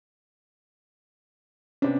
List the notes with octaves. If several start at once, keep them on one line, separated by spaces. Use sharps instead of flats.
C3 B3 C#4 D4